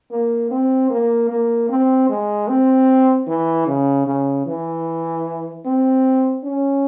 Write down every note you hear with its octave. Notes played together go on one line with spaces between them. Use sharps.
A#3
C4
A#3
A#3
C4
G#3
C4
E3
C#3
C#3
E3
C4
C#4